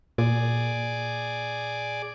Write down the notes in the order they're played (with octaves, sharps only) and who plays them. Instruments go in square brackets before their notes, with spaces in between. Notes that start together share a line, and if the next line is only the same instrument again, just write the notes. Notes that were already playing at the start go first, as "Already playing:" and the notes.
[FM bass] A#2 [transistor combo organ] G#4 D5